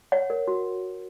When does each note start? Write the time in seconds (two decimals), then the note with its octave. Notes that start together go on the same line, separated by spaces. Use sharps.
0.12 C#5 F#5
0.30 A#4
0.48 F#4